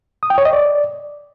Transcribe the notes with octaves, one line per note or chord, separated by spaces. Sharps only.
D#6
G5
C#5
D#5
D5